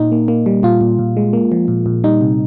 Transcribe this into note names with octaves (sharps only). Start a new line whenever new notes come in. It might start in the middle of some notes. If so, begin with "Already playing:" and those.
Already playing: A#2 D#4
A#3
A#3
G3
A#2 F4
A#2
A#2
G#3
A#3
F3
A#2
A#2
G3 D#4
C3